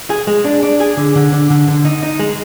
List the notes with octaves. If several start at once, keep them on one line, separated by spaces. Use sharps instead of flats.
G#4
G#3
D4
D4
G#4
D3
D3
D3
D3
D3
D#4
D#4
G#3